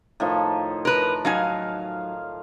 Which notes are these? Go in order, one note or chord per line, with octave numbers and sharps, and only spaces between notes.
A2 D#3 F3
A#4 B4
F#3 D#4 F5 G#5